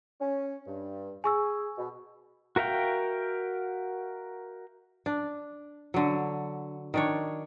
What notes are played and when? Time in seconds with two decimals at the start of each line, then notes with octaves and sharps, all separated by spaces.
0.20 C#4
0.67 G2
1.24 G#4 G#5 C#6 E6
1.78 B2
2.56 F#4 A#4 E5 F5 G5
5.06 D4
5.94 D3 F#3
6.94 D#3 D4 C#5